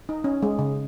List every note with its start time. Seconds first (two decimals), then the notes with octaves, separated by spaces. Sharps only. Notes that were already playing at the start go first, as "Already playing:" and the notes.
0.09 D#4
0.24 C#4
0.43 G#3
0.59 C#3